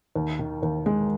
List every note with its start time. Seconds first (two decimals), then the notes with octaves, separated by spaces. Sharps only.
0.16 D#2
0.39 D#3
0.63 D#2
0.86 G#3